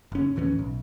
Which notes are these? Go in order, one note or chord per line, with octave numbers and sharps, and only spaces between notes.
F#1 C#4
D#2 A2 E3 C#4
B1